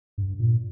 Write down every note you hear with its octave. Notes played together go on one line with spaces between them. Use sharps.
G2
A#2